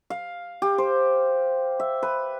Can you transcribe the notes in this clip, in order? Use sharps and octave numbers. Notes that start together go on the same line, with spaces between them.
F5
G4
C5
E5
B4